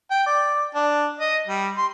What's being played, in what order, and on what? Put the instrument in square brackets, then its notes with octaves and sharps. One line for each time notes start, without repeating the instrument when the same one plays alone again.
[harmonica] G5
D5
D4
D#5
G3
C6